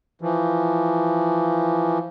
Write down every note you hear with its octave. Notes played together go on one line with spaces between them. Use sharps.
E3 F3